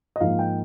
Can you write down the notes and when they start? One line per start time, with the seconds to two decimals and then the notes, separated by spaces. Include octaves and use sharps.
0.16 D#5
0.20 G#2 F3 A#3 D#4 F5
0.39 G5